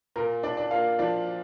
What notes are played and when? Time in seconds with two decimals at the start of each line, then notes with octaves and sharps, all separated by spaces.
0.16 A#2 A#3 A#4
0.43 A#2 D4 D5
0.57 D4 D5
0.71 A#3 F4 F5
0.99 F3 D4 D5